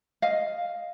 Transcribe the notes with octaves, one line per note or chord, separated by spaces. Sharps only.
D#5 F5